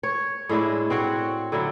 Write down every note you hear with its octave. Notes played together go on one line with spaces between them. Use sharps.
C#5
A2 G#3 D4 E4
C4 F#4 C#5 F#5
D3 F#3 E4